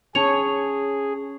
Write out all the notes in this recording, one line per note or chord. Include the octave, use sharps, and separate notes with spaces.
C#4 G#4 C#5 A5 F7